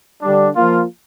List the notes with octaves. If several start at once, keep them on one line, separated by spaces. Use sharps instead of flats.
D3 G3 D4
F3 A#3 F4